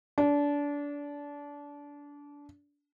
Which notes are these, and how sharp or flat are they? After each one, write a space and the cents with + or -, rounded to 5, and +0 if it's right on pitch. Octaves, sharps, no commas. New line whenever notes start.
D4 -25